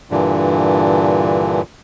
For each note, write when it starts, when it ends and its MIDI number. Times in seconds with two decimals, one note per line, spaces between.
0.11 1.62 43
0.11 1.62 46
0.11 1.62 50
0.11 1.62 52